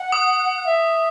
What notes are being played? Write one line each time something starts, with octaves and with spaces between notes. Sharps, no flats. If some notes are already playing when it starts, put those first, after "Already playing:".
Already playing: F#5
D#6
E5